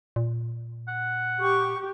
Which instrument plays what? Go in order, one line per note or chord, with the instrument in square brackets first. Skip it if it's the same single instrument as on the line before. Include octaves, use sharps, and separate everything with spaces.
[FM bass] A#2
[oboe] F#5
[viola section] G4 [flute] C#6